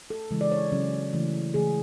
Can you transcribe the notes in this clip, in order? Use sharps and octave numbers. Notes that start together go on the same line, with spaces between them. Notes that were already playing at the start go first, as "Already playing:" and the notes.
A4
C#3 E3 G#3
D5
C#5
C#3 F#3 C#4
C#3 E3 A3
C#3 E3 A3 G#4